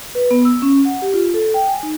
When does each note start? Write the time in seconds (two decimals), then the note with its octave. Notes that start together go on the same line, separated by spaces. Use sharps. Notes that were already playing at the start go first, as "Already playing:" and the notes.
0.15 B4
0.31 B3
0.45 E6
0.62 C#4
0.85 F#5
1.02 G4
1.14 F4
1.34 A4
1.54 G5
1.68 G#5
1.83 D#4